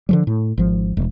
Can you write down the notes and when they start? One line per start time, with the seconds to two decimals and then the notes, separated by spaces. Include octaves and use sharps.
0.09 D3 F3 G3
0.27 A2
0.58 G#1 F3
0.97 E1